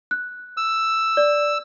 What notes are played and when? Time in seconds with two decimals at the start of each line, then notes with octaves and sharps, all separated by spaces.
0.11 F#6
0.57 E6
1.17 D5